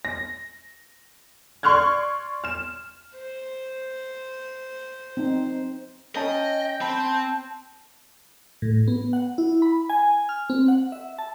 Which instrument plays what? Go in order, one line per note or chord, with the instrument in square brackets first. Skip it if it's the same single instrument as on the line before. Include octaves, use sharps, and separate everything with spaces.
[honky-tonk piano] A#6
D5 C6 C#6 F6 F#6 G#6
F6 E7
[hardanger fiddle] C5
[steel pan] C4 D#4
[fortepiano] C#4 A5 [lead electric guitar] D#5 [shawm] G5
[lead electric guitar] C4 [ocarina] A5 [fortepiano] B5
[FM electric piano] A2
B3
F#5
E4
B5
G#5
F6
C4
F#5
E5
A5